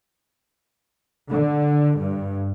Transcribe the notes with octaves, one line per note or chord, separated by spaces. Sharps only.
D3
G2